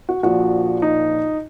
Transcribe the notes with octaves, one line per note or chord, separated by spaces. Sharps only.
F#4
A#1 A#2 F3 F#4
D#4